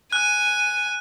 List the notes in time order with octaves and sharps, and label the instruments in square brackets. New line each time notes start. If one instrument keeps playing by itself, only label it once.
[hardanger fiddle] G#5 [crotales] F#6